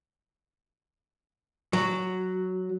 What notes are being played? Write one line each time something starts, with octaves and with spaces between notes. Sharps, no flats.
F#3